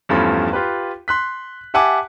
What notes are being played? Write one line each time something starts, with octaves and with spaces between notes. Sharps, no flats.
E2 G2 F3 A3 C#4 B5
F4 G4 B4
C6 F#6 B6
G4 E5 F#5 G#5 A5 D6